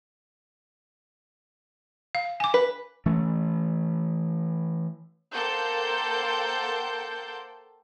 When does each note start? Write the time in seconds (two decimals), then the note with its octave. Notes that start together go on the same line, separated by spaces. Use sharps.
2.15 F5
2.40 G#5 D6
2.54 B4
3.06 E3 A3 C#4
5.33 A#3 A4 C5 F#5 G5 G6